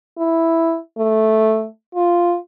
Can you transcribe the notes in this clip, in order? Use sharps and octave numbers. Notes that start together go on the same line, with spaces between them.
E4
A3
F4